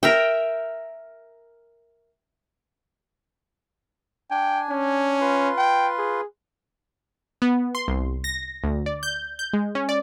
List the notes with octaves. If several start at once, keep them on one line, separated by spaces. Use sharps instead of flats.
A#4 E5 G5
D4 G5 G#5
C#4
F4 B4 C6
G5
G#4
B3
C6
C2
A#6
D2
D5
G6
G6
G#3
C#4
D5